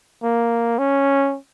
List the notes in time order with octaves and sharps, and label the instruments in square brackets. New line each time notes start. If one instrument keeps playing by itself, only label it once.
[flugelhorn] A#3
C#4